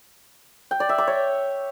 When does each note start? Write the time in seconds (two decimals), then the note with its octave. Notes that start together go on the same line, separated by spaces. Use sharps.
0.71 G5
0.80 D5
0.89 E5
0.98 D6
1.07 C#5